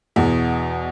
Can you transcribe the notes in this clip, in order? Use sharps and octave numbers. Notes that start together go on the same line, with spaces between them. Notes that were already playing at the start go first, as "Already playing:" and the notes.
E2 B2